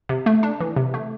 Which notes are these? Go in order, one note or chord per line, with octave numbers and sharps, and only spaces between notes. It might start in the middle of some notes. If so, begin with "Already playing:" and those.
C3
A3
D4
E3
C3
A3